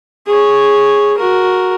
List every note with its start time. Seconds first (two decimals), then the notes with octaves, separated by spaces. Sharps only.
0.27 G#4 C#5
1.18 F#4 A#4